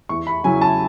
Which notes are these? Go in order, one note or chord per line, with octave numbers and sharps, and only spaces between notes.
E2 C#6
B5
C#3 F#3 C#4 E4 G#5
A5